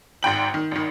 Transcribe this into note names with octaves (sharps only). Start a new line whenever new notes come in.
G#1 G#2 G5 F#7
D#3
G#1 D#3